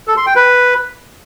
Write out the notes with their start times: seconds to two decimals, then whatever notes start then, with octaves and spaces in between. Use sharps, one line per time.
0.08 A4
0.17 C6
0.26 G5
0.36 B4